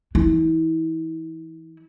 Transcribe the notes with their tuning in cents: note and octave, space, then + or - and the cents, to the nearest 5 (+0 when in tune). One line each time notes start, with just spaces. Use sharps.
E3 +0 E4 -40